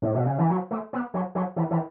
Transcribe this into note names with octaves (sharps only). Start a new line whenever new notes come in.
A2
B2
C#3
E3
F#3
A3
B3
F#3
F#3
E3
E3